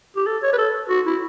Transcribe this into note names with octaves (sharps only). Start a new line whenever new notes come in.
G4
A4
C#5
B4
A4
F#4
E4